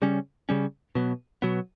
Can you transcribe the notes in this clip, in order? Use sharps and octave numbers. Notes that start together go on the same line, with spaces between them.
C#3 G3 C#4
C#3 G3 C#4
B2 F#3 B3
B2 F#3 B3